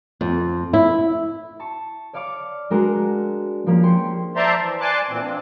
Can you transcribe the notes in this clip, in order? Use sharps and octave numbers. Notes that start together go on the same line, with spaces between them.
F2
E4
A5 C#6
C#5 D5 F5 C#6 D6
G#3 D4 F#4 A#4
F3 G#3 A#3 C#4
G4 C6 C#6
C5 D5 E5 A5 A#5 C6
E3
D5 G#5 A5 C6 D6 F#6
A#2 E3 C4
F3 C4 D4